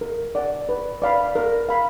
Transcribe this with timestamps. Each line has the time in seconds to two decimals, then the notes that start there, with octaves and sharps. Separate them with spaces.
0.01 A#4
0.35 D5 F#5
0.69 B4
1.02 D5 F5 B5
1.35 A#4
1.69 F5 B5